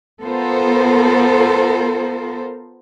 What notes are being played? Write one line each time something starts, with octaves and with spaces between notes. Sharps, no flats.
B3 F4 A4 A#4 C5